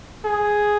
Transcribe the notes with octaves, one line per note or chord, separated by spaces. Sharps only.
G#4